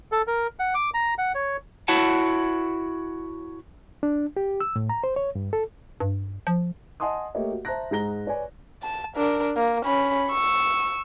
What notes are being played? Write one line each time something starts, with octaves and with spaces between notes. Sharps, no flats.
A4
A#4
F#5
D6
A#5
F#5
C#5
E4 F#4 C#5 F#5 A5
D4
G4
E6
A2
A#5
C5
C#5
G2
A4
G2
F3
D#5 F#5 G#5 A5 C6 D#6
A3 A#3 G4 C#5 D#5 E5
F#4
C5 E5 A5 A#5 F#6 A#6
G#2 G#4 A#5 A#6 G7
B4 C#5 D5 G#5
A5
D4 A#4
A#3
C#4 B5
C#6 E6